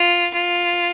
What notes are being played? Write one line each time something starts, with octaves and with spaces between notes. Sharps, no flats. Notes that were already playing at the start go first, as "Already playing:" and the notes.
Already playing: F4
F4